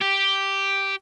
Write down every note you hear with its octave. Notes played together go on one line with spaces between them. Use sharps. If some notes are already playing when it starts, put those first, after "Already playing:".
G4